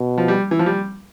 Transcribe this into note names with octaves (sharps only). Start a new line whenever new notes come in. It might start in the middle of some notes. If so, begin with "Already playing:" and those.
Already playing: B2
F3
G3
E3
F3
G3